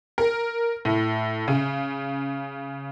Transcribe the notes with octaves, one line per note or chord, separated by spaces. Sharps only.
A#4
A2
C#3